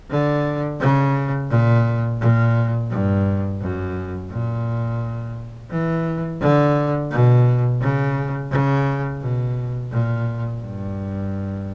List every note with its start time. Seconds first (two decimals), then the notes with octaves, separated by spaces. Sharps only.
0.11 D3
0.80 C#3
1.50 A#2
2.20 A#2
2.91 G2
3.61 F#2
4.31 A#2
5.71 E3
6.41 D3
7.11 B2
7.81 C#3
8.52 C#3
9.22 B2
9.92 A#2
10.62 G2